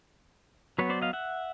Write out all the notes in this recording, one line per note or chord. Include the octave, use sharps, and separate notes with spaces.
F#3 B3 B4 C#5
C5 D5
D#5 F5
E5 F#5